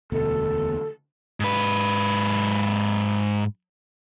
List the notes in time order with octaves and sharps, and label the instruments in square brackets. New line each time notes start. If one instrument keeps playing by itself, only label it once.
[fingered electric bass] E1 D2 B2 [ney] A4
[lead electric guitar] G#2 B4